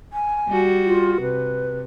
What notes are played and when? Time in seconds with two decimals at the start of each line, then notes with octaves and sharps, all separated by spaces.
0.13 G#5
0.48 G3 F#4
0.85 F4
1.21 C3 B4